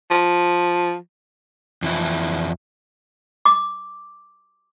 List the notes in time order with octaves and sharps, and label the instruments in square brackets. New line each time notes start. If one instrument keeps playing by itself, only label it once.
[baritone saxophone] F3
[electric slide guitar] F2 E3 F3 E4
[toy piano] D6